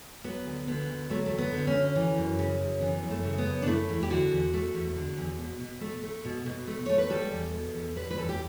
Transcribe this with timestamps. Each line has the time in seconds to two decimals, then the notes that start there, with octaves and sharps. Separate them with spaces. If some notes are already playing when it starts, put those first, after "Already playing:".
0.24 F#3 B3
0.45 D2
0.67 D3 B3
0.89 D2
1.10 F#3 A3
1.26 A3
1.31 D2
1.38 B3
1.53 D3
1.67 C#4
1.74 D2
1.96 E3
2.17 F#2
2.39 C#3
2.60 F#2
2.81 E3 B3
3.03 F#2
3.11 A3
3.25 C#3
3.38 B3
3.46 F#2
3.62 D4
3.67 A3 E4
3.89 E2
4.03 G4
4.10 D3 F#4
4.32 E2
4.54 A3
4.74 E2
4.96 D3
5.17 E2
5.39 B2
5.60 B2
5.81 A3
6.03 A3
6.25 B2
6.46 B2
6.67 A3
6.86 A3 C#5
6.98 B4
7.10 G3 A4
7.32 E2
7.54 B2
7.74 E2
7.96 G3 B4
8.11 B4
8.17 E2 A4
8.29 G4